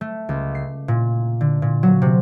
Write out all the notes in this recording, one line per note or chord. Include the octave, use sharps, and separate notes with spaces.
A3
C#2
C7
A#2
D3
A#2
F#3
C3